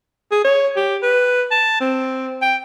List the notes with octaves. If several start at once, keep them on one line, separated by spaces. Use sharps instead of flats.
G#4
C#5
G4
B4
A5
C4
G5